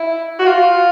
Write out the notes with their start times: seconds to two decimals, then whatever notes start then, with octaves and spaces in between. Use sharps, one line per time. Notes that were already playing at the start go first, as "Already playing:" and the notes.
Already playing: E4
0.39 F#4
0.46 F4